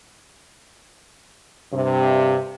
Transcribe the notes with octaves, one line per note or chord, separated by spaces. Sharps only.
G2 C3